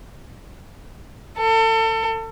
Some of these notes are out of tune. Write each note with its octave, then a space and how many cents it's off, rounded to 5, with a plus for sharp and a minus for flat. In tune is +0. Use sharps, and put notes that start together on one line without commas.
A4 +35